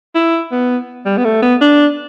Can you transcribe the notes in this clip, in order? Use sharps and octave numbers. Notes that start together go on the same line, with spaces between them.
E4
B3
G3
B3
A3
B3
D4